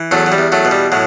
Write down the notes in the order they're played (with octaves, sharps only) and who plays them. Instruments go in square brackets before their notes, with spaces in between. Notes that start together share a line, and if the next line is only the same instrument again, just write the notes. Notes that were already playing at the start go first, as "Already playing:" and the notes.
Already playing: [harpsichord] E3
E2 F#3 A3
F#3
G3
E2
F#3 A3
B2
G3
A2 F#3